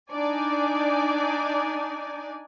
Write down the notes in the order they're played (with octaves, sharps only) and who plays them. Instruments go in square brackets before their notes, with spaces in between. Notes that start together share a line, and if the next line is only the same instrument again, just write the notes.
[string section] D4 D#4 D5 G#5